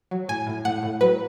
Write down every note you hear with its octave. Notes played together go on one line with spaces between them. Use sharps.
F#3
A2 G#5
A2
A2 F#5
A2
F#3 B4